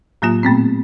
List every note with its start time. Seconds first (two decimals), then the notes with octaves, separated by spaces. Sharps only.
0.22 A2 F#3 A#3 F4
0.43 A#2 A3 B3 C4